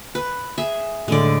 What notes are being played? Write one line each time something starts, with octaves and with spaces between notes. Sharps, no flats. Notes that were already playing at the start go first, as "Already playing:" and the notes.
B4
G#4 E5
A2 D3 G#3 D5